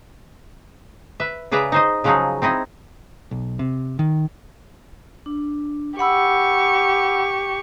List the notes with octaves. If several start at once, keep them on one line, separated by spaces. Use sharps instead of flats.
B4 E5
C#3 G#4 B4 D5 E5 A#5
D#4 C5 D#5
C#3 F3 F#3 C#4 D#4 G#4
C4 D#4 E4 D#5
B1
C3
D#3
D4
G4 F#5 B5 C#6 E6